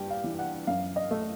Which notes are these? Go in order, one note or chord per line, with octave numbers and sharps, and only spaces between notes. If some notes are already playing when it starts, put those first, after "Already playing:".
Already playing: G2 G3 G5
F5
E3
F#5
F#2 F5
D#5
A3